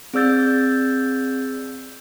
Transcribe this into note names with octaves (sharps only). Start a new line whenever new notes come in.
C4 G#4 D5 E6 G6 A6